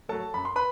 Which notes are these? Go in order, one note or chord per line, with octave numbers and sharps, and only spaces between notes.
F#3 A3 A4 A5
F#2 B5
C6
B4 B5